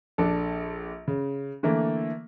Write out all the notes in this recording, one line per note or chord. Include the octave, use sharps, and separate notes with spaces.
A#1 D4 A4
C#3
D3 E3 A3 A#3